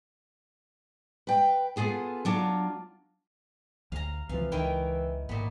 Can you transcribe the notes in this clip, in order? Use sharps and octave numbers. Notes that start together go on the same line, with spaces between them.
B4 G5
B3 F4 G#4 A4
F#3 D4 F4
D2 F5 A#5
C#2 C3 E3 F3 F5
C#2 D#3 E4 G5
G#1 A#2 B3